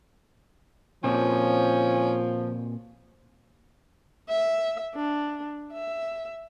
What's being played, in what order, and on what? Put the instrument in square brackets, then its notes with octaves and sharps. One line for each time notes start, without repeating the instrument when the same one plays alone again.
[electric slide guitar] A#2 C4 [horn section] F3 [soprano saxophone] C#4
[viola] E5
D4
E5